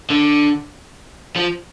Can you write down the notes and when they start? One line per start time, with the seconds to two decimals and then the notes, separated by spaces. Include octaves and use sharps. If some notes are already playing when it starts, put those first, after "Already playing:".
0.10 D3
1.36 F3